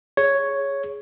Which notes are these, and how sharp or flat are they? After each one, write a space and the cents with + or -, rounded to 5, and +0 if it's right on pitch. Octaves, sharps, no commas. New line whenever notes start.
G#4 +0 C#5 +0